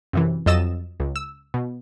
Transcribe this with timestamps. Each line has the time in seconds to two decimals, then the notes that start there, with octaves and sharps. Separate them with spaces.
0.13 F#2 C3 E3
0.46 F2 F#3 D#5 E6 A6 E7
1.00 C#2
1.16 E6
1.54 B2